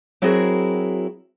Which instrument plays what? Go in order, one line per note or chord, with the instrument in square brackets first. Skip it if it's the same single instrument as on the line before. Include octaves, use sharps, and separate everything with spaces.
[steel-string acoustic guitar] F#3 C4 E4 F#4 G#4 A#4